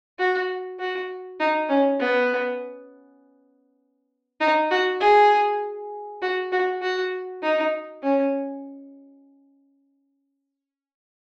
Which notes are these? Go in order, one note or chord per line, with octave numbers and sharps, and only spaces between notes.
F#4
F#4
D#4
C#4
B3
D#4
F#4
G#4
F#4
F#4
F#4
D#4
C#4